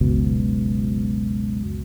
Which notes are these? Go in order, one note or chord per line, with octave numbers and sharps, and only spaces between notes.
F#1 C#2 B2